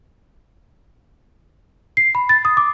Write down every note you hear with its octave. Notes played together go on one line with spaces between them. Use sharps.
C7
B5
A6
D#6
D6